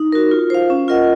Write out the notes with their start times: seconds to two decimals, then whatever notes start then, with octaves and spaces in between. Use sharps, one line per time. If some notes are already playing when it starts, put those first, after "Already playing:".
Already playing: D#4
0.12 F#4 A#4
0.31 F4
0.50 C5 F5
0.70 C#4
0.88 F4 A#4 D#5 F#5